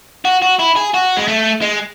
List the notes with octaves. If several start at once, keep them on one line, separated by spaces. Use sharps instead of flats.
F#4
F#4
E4
G#4
F#4
G#3
A3
G#3